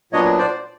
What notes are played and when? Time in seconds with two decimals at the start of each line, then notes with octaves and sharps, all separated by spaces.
0.13 A#2 F#3 B3 D4 C#5 D#5
0.38 C5 D5